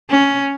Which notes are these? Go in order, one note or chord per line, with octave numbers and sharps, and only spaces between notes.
C#4